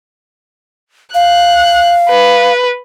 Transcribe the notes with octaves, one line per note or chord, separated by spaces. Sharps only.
F5 F#6
B4